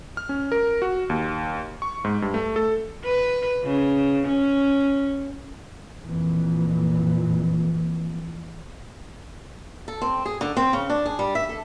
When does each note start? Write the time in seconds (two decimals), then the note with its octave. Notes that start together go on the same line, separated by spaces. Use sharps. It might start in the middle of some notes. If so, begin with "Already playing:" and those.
0.17 F6
0.29 C#4
0.52 A#4
0.82 F#4
1.10 D#2
1.82 C#6
2.04 G#2
2.22 G2
2.34 A3
2.56 A4
3.04 B4
3.64 C#3
4.27 C#4
6.03 F2 A#2 E3
9.88 A4
10.02 C4
10.26 G#4
10.41 D3
10.57 C4
10.73 C#3
10.90 D4
11.06 G#4
11.19 G3
11.35 E5
11.49 A4